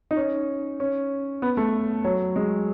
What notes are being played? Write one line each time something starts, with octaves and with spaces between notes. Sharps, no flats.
D#4
C#4
C#4
B3
A3
F#3
G#3